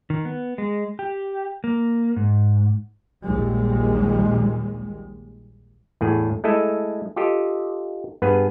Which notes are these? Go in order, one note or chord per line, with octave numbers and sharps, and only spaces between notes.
D#3
B3
G#3
G4
A#3
G#2
A#1 D#2 G3 G#3
E2 A2 G#4
G#3 A3 E4 A4 D#5 E5
F4 G4 A4 D#5
G2 B3 G#4 B4 G#5